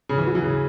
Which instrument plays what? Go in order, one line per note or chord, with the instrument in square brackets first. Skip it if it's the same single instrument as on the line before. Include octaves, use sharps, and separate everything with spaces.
[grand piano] C#3
E3
F#3
E3
C#3